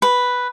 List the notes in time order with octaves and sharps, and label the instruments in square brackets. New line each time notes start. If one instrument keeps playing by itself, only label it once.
[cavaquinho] B4